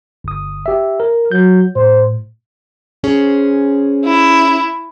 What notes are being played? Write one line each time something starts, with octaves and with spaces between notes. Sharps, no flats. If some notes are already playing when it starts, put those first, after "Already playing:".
G1 D#6
G4 E5
A#4
F#3 G6
A2 C5
C#4 G#4 C5
E4